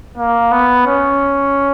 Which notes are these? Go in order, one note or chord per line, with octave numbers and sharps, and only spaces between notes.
A#3
B3
C#4